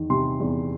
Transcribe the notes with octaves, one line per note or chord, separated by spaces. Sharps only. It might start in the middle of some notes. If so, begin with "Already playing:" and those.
Already playing: E2 D#3
C3 C6
E2